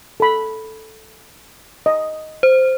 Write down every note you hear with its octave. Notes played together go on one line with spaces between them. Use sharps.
A4 B5
D#5
C5